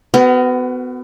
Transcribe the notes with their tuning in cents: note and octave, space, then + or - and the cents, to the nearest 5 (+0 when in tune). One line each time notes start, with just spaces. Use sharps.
B3 +30 F#4 +5 A#4 -10